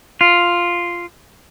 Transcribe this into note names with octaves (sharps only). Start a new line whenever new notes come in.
F4